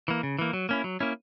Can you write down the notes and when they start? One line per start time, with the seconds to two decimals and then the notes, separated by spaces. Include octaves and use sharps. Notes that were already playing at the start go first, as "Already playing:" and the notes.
0.08 E3 A#3
0.23 C#3
0.39 E3 A#3
0.53 F#3
0.69 A#3 C#4 E4
0.84 F#3
1.00 A#3 C#4 E4